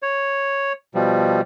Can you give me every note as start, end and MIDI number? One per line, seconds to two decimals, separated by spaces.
0.03 0.73 73
0.95 1.41 47
0.95 1.41 53
0.95 1.41 55